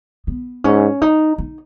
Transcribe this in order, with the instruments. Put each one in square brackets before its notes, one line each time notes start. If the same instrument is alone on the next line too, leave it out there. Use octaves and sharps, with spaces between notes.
[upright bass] B3
[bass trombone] G#2 [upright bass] C#4
[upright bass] D#4
D#4